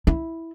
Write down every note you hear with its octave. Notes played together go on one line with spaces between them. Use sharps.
E4